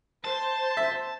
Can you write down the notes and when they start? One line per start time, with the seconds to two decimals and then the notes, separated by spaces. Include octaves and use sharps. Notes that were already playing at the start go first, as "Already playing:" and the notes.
0.25 C5 A5
0.77 E5